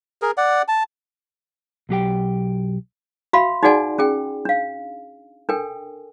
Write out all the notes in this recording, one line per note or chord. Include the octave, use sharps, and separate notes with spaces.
G#4 A#4
D5 F#5
A5
B1 F#3 G4 G5
F#4 E5 F5 B5 C6
D#4 F#4 G#4 D5 F#5 G#5
C#4 G#4 G5
D4 F5
D4 A4 A#4 G5 G#5